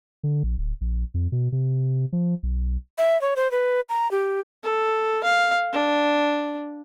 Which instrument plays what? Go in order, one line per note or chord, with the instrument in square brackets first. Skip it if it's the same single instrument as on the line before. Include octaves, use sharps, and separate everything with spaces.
[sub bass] D3
A#1
D1
A#1
F2
B2
C3
F3
B1
[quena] E5
C#5
C5
B4
A#5
G4
[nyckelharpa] A4
F5
D4